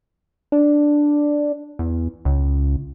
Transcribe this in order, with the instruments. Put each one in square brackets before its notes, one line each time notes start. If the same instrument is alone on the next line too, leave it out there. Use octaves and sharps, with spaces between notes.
[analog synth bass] D4
E2
C#2